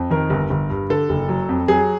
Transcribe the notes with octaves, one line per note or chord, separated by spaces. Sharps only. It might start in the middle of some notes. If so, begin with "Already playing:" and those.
Already playing: F2
D#3 A#4
G1
G1
G2
D3 A4
F#1
F#3
F2
F#3 G#4